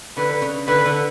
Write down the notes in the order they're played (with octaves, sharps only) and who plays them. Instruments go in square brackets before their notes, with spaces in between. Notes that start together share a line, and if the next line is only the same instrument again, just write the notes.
[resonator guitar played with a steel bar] D3 [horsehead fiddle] B4
[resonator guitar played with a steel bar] C#3
[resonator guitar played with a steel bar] D3 [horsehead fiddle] B4
[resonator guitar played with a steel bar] D3